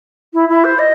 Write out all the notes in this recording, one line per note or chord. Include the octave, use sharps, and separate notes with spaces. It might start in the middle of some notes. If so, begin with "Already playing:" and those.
E4
E4
C5
D#5